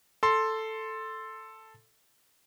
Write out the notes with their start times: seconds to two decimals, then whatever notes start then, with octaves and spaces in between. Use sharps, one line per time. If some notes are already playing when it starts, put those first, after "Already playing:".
0.23 A4 C6